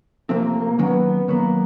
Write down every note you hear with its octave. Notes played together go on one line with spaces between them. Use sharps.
C3 F3 A3 A#3 C4
D#3 F#3 A#3 B3 C#4
D#3 F#3 A#3 B3